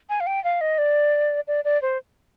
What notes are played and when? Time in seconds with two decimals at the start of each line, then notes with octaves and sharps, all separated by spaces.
0.09 G#5
0.20 F5
0.27 G5
0.44 F5
0.61 D#5
0.78 D5
1.48 D5
1.65 D5
1.82 C5